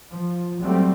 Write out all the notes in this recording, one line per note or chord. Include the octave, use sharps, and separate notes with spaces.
F3
F#3 G3 A3 C4